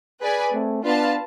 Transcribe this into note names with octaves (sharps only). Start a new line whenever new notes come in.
G#4 B4 D5 G#5
A3 C4
B3 D4 F4 B4 F5 A5